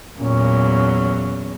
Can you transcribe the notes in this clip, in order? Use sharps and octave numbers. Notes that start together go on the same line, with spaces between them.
E2 A#2 F#3 C#4